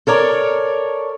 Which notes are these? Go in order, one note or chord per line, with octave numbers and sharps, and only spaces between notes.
A4 A#4 C#5 D5